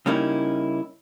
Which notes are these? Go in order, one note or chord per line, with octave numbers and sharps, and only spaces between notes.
C#3 G3 A#3 C#4 D#4 E4